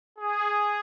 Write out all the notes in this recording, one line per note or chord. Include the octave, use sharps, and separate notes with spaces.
G#4